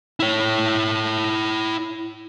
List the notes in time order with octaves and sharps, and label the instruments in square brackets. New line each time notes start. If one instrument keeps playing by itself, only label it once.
[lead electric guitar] E4 C#5